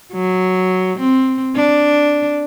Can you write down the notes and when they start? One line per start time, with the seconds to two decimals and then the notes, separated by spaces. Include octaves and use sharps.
0.13 F#3
0.99 C4
1.55 D4